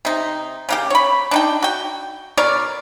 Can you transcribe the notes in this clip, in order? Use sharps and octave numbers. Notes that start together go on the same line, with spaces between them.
C3 D#4
C#3 A#3 G4
C#5 B5
D4 D#4 G5
F#4 G5
B2 A#4 C#5 D5